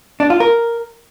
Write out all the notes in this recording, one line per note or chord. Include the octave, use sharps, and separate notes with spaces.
D4
F4
A#4